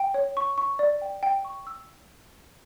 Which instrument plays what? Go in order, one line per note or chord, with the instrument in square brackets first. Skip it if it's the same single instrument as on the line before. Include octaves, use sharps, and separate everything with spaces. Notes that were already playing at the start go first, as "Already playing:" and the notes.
Already playing: [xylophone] G5
C#5
C#6
C#6
D5
G5
G5
C#6
E6